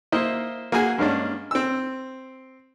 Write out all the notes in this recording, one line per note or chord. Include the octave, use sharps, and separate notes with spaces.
A#3 E4 C5 D#5
A#3 F#4 G#4 G#5
G2 G#3 A#3 C#4 D4
C4 E6